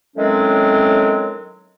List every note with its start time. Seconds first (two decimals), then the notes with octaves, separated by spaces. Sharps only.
0.16 A2 D#3 F#3 G#3 C4 C#4